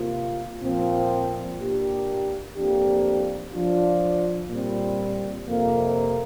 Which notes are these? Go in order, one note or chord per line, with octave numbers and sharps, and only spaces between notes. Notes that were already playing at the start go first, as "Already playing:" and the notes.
Already playing: C3 A#3 F4
A#2 F3 C4
A#2 A#3 D4 G4
F2 F3 A#3 D4 G4
F3 D4 F4
A#2 G3 C4
F2 C3 A#3